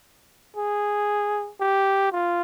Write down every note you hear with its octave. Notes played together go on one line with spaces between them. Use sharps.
G#4
G4
F4